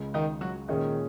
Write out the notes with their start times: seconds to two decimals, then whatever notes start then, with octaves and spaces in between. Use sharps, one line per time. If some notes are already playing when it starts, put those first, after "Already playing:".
Already playing: C#2 C#3 G#3
0.14 D#3 D#4
0.41 F#3 F#4
0.68 A#2 D#3 G#3 C#4 D#4 G#4